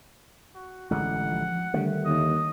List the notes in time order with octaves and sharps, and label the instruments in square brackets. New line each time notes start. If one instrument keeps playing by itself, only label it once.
[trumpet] F#4
[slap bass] A1 D3 G#3 [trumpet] F#5
[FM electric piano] F3
[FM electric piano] D3 G3 [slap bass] D#3 A3
[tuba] D#2 [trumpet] D#5